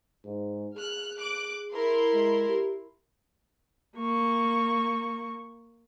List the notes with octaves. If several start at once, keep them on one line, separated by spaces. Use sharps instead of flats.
G#2
G#4 F6 F#6
D6 F#6 D7
E4 A#4 C6
G#3
G4
A#3 C#6